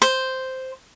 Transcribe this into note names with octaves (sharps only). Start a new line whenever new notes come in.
C5